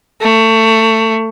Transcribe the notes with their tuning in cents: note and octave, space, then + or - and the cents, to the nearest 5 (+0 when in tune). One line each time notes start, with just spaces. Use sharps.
A3 +25